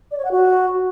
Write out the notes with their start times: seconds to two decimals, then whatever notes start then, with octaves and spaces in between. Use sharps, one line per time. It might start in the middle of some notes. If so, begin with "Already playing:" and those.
0.11 D5
0.18 C#5
0.25 F#5
0.31 F#4